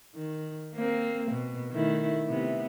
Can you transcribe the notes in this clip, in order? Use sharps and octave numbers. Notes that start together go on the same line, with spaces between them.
D#3
A#3 C4
B2
D#3 A3 E4
C3 B3